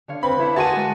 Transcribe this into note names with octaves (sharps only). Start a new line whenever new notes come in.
D3 C#5 F5
C4 B4 B5
D3 E4 A4 C#5
F#4 G#4 A#4 G#5 A5 C6 D#7
G#3